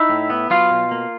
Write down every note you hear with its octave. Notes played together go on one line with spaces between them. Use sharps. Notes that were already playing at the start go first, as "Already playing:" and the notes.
Already playing: D#4 E4 E5
A2
B3
F#3 F4 F5
B2
A#3